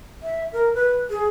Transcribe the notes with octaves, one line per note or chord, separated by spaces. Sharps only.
E5
A#4
B4
G#4